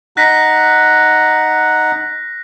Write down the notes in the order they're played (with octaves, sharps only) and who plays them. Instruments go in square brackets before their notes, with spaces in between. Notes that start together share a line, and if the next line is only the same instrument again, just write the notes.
[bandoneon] D#4 F#5 [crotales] F#6 A#6 B6